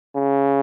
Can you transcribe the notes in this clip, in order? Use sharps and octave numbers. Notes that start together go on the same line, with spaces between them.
C#3